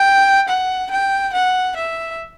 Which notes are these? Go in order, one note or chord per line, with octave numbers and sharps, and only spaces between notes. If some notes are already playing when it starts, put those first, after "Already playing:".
Already playing: G5
F#5
G5
F#5
E5